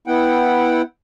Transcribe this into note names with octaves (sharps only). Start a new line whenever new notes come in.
B3 E4 F#5 G5